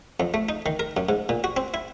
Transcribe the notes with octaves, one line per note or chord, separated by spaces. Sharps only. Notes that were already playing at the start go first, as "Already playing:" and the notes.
F2
A3
D#4
D#3
A#4
F#2
G#2
A#2
F#4
C4
E4